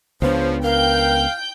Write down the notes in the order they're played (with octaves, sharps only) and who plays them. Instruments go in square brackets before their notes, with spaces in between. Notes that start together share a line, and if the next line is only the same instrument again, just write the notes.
[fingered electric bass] C#2 B3 D4 [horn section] C#3 F3 [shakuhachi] C5
[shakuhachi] A#4 [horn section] F5 [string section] G5 G6